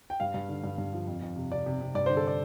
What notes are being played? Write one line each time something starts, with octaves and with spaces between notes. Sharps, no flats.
G5
G2 F5
G2
D3
G2
G2
F3
F2
F2
C3
C3 D5
C3
C3
G2 D5
D3 C5
A4
D5